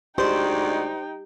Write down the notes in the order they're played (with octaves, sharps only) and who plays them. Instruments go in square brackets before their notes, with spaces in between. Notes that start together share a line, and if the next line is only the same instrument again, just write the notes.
[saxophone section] D2 G#3 D5 [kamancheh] D#4 G5 [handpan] G4 [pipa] C5